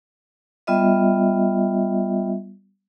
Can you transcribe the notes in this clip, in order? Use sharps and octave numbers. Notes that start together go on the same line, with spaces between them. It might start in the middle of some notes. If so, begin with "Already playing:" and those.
G3 B3 F4 D#5 E5